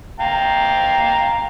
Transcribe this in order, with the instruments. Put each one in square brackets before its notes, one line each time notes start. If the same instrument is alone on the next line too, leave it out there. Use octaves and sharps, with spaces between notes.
[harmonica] F5 G5 A#5